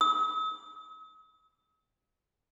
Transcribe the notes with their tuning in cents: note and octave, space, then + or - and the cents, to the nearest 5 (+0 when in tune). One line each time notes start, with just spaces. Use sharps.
D#6 +45